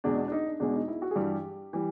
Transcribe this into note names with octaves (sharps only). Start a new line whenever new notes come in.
E2 B2 G#3 D4
D4
D4
D#4
D4
E2 B2 G#3 D4
D#4
E4
F#4
G#4
G2 E3 G3 G4
E3 G3